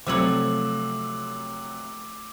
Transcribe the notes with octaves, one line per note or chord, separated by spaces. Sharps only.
C3 F3 F#3 A3 C#5 D6 E6 F#7